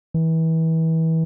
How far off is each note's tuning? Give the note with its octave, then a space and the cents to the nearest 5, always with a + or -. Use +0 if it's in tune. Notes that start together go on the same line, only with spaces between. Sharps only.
E3 -30